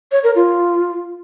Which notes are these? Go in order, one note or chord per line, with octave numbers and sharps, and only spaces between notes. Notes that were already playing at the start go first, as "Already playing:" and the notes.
C#5
A#4
F4